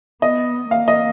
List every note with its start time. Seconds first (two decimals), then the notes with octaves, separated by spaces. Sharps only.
0.22 B3 D#5
0.71 A#3 F5
0.88 D#5